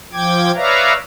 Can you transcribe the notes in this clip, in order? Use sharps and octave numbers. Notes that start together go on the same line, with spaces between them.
F3 G5 D6 G#6
B4 C#5 D5 E5 F5 A#5